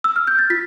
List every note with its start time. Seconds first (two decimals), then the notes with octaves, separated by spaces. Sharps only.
0.04 E6
0.16 F6
0.27 G6
0.39 A6
0.50 F4 B6